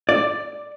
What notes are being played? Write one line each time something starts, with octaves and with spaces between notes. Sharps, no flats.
D5